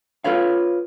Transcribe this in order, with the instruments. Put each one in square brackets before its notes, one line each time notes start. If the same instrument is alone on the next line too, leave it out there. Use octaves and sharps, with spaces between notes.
[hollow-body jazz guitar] F4 A4 B4 C#5 F5